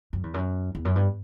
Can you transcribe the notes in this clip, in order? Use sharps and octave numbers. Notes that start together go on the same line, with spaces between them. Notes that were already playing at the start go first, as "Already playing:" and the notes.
F#2
E2
F#2
E2
F#2
G2